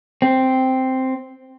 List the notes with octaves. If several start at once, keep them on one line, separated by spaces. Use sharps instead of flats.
C4